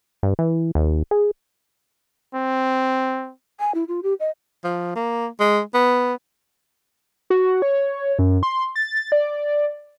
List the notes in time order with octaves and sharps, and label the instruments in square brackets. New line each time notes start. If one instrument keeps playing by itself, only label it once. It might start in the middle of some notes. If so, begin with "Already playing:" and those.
[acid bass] G2
E3
D#2
G#4
[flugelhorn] C4
[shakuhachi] G#5
E4
F4
G4
D#5
[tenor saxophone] F3
A#3
G#3
B3
[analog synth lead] F#4
C#5
F#2
C6
A6
D5